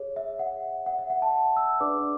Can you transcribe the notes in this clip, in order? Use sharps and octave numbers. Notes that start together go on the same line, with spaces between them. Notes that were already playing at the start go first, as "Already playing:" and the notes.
Already playing: G#4 C#5
E5
F#5
F#5
E5
F#5
A5
E6
D4 G#4 B4 D5 D6